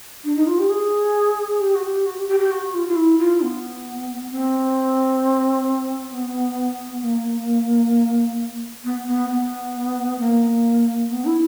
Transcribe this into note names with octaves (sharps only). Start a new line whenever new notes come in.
D4
D#4
F4
G4
G#4
G4
F#4
G4
F#4
G4
G4
G4
F#4
F4
F4
E4
F4
B3
C4
B3
A#3
B3
B3
B3
A#3
B3
E4